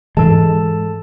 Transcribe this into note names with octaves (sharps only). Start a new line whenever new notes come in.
G#2 E3 G#3 A4 A5